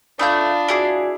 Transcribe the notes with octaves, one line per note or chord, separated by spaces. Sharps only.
A3 D4 F4 E5 F5 B5 D#6 G6
E4 F#4 G#4 D5 G#5 D6